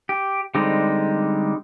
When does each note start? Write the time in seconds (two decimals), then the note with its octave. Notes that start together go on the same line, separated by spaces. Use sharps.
0.09 G4
0.55 D3 G3 G#3 C4 D#4